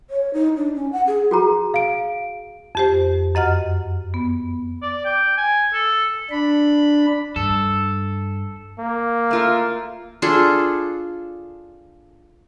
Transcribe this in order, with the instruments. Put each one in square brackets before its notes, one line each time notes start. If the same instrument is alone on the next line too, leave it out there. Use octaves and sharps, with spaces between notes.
[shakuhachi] C#5
D#4
D4
C#4
F#5
G#4
[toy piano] F#4 G#4 A#5
[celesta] F5 D7
[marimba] F2 G4 C5
F#2 D#5 F#5 F6
B3
[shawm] D5
G5
G#5
A4
[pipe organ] D4 B5
[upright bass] G2 [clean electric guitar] A4
[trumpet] A#3
[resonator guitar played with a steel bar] A3 F4 A#4
[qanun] D4 F4 G#4 A4